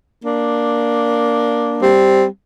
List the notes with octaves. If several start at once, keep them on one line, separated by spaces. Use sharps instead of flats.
A#3 D4
G3 C4